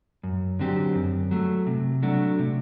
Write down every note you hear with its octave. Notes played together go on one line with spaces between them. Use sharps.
F#2
D3 F#3 C4 G4
F#2
F#3 A3
C3
F#3 A3 D4 F#4
C3